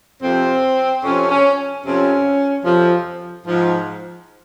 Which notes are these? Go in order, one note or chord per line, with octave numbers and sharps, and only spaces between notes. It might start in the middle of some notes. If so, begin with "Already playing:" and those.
F2 C3 F3 C4
F2 C3 F3 C#4
C#4
F2 C3 F3 C#4
F2 C3 F3
G#2 F3